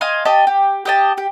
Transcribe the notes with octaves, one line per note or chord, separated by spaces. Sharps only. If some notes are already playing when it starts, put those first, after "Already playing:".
D#5 F5 G#5 C6
G4 D#5 A5
G4
G4 D#5 A5
G4